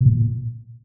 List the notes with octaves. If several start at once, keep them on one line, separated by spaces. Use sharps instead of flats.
B2
A#2